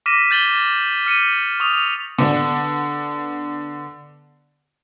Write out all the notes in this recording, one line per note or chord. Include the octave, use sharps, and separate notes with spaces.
D6 F6 A#6 B6 D#7 E7
G6 A6 F#7 G7
F6 C#7 D#7
C#6 D#6 F7
F7
D3 B3 D4